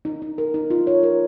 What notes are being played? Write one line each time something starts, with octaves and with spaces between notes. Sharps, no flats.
D#4
D#4
A#4
D#4
F4
C#5
A#4